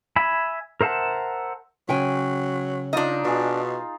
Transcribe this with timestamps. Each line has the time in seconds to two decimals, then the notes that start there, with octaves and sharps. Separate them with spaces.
0.16 E5 G#5 B5
0.81 A#4 C5 E5 F#5 A5
1.89 C#3 F#3 G5 G#5
2.93 D4 D#4 F4 D#5
3.24 B2 F4 G#4